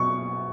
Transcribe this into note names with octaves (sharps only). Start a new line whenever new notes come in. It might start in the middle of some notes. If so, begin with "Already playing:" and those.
Already playing: B2 F#3 C#6